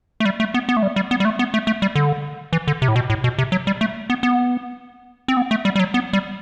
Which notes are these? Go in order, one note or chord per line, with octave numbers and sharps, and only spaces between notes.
A3
G3
A3
B3
B3
A3
G3
G3
B3
G3
A3
B3
A3
A3
G3
D3
E3
D3
C3
A2
B2
A2
B2
C3
F#3
G3
A3
B3
B3
C4
B3
A3
G3
G3
F#3
B3
G3